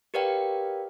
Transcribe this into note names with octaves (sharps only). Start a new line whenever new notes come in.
G4 A#4 B4 D5 F5 G5